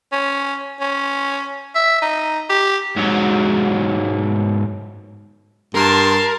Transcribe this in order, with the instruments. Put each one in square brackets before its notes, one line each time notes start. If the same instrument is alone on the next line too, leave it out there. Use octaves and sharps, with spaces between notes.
[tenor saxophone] C#4
C#4
E5
D#4
G4
[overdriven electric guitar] G#2 F#3
[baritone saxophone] G2 [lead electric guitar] A#4 [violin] A5 C6